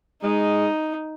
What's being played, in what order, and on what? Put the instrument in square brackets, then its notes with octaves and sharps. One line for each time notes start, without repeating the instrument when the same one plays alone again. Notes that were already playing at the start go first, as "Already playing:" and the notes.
[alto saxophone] G#3 [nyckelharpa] D#4